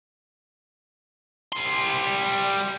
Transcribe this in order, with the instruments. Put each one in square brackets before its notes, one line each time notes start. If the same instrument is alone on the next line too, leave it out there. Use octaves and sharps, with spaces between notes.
[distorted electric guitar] G3 C6